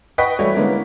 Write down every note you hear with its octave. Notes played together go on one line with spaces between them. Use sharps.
B4 D#5 F#5 G5 C#6 B6
E3 G3 A3 E4 F#4 C#5
D3 G#3 A#3 B3 C#4 E4